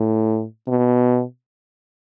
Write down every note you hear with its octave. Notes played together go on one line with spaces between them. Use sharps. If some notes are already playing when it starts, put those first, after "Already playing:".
Already playing: A2
B2